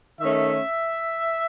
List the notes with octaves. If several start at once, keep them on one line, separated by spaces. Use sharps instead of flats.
D#3 A3 C#4 E5